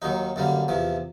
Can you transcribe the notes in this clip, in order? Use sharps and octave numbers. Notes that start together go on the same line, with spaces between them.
D#2 D#3 F#3 D#4
F#2 D3 G3 A#3
E2 C3 F3